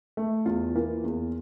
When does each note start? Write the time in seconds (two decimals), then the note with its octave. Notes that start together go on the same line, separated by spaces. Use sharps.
0.17 A3
0.46 E2 F4
0.75 E3 A#3
1.04 E2